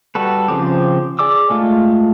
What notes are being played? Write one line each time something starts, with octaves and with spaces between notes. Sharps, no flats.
G3 F#4 A4 B4
C#3 F3 C4 G4
G#4 D5 D6 E6
G#3 A3 F4